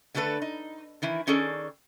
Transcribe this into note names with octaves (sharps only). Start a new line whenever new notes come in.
D3 A3 D4 A4 B4
D#4
D#3 E3 E4
D#3 C#4 G#4 A4 D5